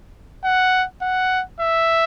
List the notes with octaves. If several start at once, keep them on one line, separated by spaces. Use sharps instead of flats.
F#5
F#5
E5